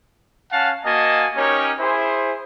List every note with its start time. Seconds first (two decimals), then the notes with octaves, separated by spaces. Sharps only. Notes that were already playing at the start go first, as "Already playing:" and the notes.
0.52 C#4 F5 F#5 A5
0.84 A#3 F#4 D#5 G#5 A5
1.35 C#4 D#4 G4 A#4 C#5
1.78 E4 G#4 C5